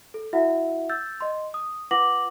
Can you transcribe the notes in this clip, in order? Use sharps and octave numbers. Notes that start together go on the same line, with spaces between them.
A4
E4 F#4 E5 F#5
E6 G6 A6
D#5 C6
D#6
F4 B4 F#5 D6 A#6 F#7